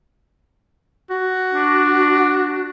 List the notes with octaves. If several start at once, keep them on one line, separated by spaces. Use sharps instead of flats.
F#4
D4